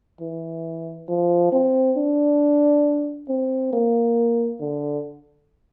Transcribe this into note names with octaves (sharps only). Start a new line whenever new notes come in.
E3
F3
C4
D4
C4
A#3
D3